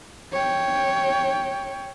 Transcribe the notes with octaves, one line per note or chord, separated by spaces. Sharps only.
C#5 G5